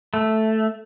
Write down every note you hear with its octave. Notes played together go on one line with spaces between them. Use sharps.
A3